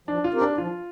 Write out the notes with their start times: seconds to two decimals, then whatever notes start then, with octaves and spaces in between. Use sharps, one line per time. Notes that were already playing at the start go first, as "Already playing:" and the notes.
0.08 F3 D4
0.24 F4
0.33 C4 G4 A#4
0.41 D4
0.58 F3 F4